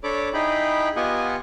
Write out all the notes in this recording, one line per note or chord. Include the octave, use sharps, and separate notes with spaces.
D4 A4 C#5 B5 D6
D#4 E4 G#4 G5 B5
B3 F4 G4 D#5 F#5 G#5